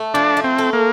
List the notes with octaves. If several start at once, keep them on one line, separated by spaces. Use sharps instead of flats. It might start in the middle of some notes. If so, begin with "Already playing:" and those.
Already playing: A3
F3 D4
A3
C4
A4
A#3